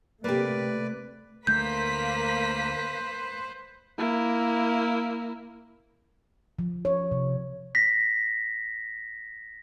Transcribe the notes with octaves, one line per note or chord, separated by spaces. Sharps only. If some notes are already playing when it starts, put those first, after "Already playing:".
C3 A3 A#3 G4 B4 D5
D2 A3 A#3 B4 C5 G6 B6
A#3 E4
F3
C#5
C3
A#6 B6